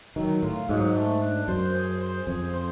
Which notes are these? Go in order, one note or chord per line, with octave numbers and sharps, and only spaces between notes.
D#3 F#3
A2 F4
G#2 F#3
A3
D4
F#2 C5
G#4
C5
F2 G#4
C5